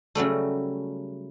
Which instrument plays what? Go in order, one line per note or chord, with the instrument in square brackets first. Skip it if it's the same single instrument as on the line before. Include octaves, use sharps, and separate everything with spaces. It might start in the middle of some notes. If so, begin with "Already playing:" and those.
[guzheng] C#3 F#3 G3 A3